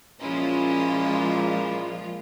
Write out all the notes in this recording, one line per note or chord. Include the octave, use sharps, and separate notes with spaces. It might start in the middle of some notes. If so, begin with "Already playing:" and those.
A#2 F3 G#3 C#4 E4 F4 D#5